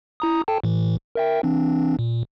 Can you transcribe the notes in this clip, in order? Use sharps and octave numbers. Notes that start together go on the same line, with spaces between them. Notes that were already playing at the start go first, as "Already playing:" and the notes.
E4 A#5 D#6
A4 G5 A5
A2 E3
A#4 E5 G5
E3 C4 D4
A#2